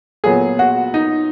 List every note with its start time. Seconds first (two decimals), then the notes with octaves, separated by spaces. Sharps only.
0.24 A#2 F#3 B3 G#4
0.59 F#4
0.94 D#4